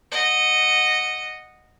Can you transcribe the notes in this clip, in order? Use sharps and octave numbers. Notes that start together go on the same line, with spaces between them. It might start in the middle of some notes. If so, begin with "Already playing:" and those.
D#5 F#5